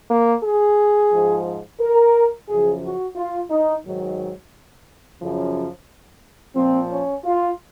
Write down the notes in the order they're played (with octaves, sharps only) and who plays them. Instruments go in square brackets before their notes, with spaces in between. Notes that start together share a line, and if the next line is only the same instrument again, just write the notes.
[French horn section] A#3
G#4
G#2 F3
A#4
F#2 C#3 F3 G#4
F#4
F4
D#4
G#2 D#3 F#3
F#2 C#3 F3
A#2 F3 C4
C#4
F4